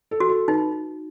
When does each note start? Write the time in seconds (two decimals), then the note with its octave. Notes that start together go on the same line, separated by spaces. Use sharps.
0.11 A4
0.20 F#4
0.29 A4
0.48 D#4 B4